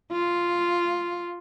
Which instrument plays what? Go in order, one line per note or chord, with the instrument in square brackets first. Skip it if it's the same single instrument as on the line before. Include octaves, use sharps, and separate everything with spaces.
[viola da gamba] F4